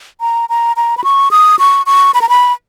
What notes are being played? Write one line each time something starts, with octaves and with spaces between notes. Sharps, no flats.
A#5
A#5
A#5
B5
C#6
D#6
C#6
C#6
B5
A#5
B5